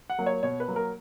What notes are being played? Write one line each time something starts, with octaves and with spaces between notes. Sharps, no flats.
F#5
F#3 A#3
C#5
B2 C#5
B4
F#3 A#3
A#4